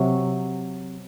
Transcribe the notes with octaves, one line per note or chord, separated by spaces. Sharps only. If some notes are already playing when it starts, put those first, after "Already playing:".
Already playing: C3 F#3